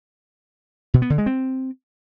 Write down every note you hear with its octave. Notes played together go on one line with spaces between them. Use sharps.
B2
B3
D3
G#3
C4